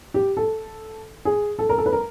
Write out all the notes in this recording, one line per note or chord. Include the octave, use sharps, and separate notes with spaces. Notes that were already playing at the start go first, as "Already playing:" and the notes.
G4
A4
G#4
A4
A#4
A4
B4
A#4